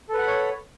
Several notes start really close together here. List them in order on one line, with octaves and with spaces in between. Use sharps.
A4 B4 F#5 B5 C#5